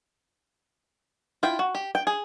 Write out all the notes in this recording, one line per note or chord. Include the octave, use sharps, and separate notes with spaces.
E4 F4 G5
F#4
G4
G5
G#4